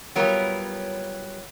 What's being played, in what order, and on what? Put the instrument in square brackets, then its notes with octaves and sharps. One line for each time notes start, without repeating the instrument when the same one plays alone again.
[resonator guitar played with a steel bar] F#3 G3 B3 F4 A#4 C#5